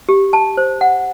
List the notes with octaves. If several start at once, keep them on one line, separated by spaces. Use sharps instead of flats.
G4
A5
C5
F#5